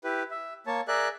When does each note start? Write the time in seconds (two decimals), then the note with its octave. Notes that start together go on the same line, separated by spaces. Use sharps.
0.04 E4 G4 B4
0.31 E5
0.67 A#3 C#5 A5
0.88 G#4 A#4 D5 E5 F#6